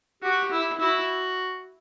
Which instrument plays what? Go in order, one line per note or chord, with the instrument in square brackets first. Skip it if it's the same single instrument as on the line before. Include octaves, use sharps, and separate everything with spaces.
[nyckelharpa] F#4 [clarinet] G4
[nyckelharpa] E4
[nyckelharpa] E4 [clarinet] F#4